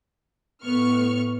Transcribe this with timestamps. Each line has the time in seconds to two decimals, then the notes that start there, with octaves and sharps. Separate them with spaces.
0.63 A2 B3 C#6 F6